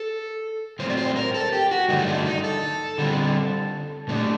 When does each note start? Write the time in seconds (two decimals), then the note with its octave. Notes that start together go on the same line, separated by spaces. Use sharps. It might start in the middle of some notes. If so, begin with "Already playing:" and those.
Already playing: A4
0.79 A2 F#3 C4 C5
0.90 D5
0.97 C5
1.16 A#4
1.34 A4
1.53 G4
1.71 F#4
1.89 G2 D3 F#3 A3 D#4
2.07 D4
2.26 D#4
2.44 A4
2.98 D3 G3 C4
4.08 A#2 A3 D4